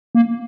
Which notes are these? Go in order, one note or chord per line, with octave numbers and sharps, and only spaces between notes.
A#3